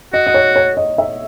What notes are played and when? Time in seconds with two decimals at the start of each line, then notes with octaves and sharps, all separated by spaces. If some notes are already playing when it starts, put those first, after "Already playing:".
0.13 F#4 D#5
0.27 D#5
0.34 C#5
0.56 C#5
0.77 D#5
0.98 E5